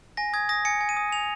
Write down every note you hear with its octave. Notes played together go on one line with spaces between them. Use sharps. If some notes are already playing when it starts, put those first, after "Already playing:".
G#5 A#6
D#6 G#6
D#6 A#6
G#5 C#7
G#5
D#7
D#6
G#5 F7